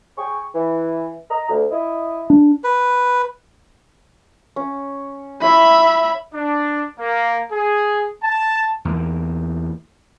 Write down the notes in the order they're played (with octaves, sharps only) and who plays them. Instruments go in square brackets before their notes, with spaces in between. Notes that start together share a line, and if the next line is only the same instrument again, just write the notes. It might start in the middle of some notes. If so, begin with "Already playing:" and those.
[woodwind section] G#4 G5 C#6
E3
D#5 A#5
D2
E4 D#5
[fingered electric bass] D4
[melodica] B4
[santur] C#4
[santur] E4 C#5 E6 [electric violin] E5 B5
[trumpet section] D4
A#3
G#4
A5
[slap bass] E2 A#3